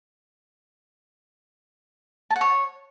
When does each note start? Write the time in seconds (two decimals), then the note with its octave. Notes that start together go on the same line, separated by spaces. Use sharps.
2.30 A5
2.36 F#5
2.41 C#5